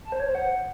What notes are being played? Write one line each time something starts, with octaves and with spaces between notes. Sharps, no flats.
A5
C5
C#5
C5
F#5